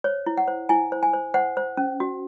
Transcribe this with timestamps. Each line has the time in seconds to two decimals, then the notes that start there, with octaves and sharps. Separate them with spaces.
0.04 C5 C#5
0.26 E4
0.37 F#5
0.48 C5
0.69 E4 G#5
0.92 C5
1.03 G#5
1.14 C5
1.34 C5 F#5
1.57 C5
1.77 C#4
2.00 F#4